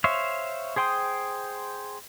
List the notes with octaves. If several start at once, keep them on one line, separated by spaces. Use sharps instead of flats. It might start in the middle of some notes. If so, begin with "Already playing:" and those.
C5 C#5 E5 F5
G#4 C5 G5 C6 D#6